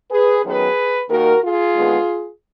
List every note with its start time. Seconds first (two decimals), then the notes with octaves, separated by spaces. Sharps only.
0.11 G#4 B4
0.44 F#2 D#3 F#3 B3 G#4 B4
1.09 D#2 D#3 A#3 F#4 A#4
1.41 F4 G#4
1.74 D#2 D3 G#3 B3